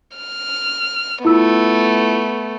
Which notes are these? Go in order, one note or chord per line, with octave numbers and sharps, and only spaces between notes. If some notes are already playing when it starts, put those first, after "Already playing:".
F6
A3 B3 E4 F4 E6